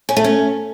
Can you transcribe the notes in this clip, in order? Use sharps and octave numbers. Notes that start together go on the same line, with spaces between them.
C#4
A3
C#4